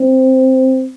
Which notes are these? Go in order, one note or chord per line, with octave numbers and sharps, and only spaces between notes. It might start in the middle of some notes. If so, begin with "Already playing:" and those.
Already playing: C4